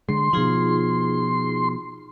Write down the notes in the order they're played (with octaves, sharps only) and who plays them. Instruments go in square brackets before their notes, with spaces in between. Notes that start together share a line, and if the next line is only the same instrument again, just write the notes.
[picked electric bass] D3 G#3 [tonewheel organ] C6
[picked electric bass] B2 F3 [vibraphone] D#4 F4 G#4